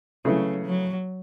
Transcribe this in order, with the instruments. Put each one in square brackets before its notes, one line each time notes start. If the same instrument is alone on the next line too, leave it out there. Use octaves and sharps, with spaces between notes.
[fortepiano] C#3 E3 A3 [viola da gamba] F#3
[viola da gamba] F#3